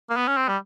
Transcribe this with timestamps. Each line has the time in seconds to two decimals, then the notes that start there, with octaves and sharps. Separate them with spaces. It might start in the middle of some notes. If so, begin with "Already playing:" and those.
0.10 A#3
0.17 B3
0.28 C#4
0.37 C4
0.49 G3